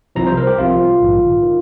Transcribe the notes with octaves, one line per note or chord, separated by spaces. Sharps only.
C2 C3 F3 A#5
C5
A#4
G4
C2 C3 F3 F4
A#1 G#2 D#3
D#3